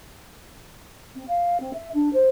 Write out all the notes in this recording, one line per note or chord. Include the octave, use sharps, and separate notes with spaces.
C4
F5
C4
E5
D4
C5